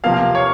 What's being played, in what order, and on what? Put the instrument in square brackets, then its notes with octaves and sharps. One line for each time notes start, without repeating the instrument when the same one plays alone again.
[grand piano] C3 F3 A#3 F5
F5
C#5